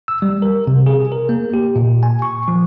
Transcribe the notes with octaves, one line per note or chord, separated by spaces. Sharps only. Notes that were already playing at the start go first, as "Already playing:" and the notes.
E6
G3
A#4
C3
G#4
A#4
A#3
G4
A#2
G#5
C#6
F3